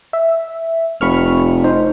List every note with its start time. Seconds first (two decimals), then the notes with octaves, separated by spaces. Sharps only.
0.13 E5
1.01 F1 B5 C#6 F6
1.64 D#4 C5